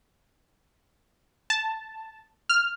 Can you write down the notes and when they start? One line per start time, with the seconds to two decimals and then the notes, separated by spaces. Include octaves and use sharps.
1.50 A5
2.49 F6